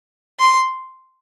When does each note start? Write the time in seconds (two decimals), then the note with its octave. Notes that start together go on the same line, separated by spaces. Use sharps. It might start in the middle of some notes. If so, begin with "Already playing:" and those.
0.40 C6